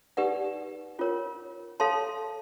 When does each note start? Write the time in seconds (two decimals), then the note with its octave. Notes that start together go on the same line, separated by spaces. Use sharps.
0.17 D#4 G4 B4 D5 F#5
0.99 C#4 F4 A#4 C#5
1.80 A4 C#5 F5 A5 C6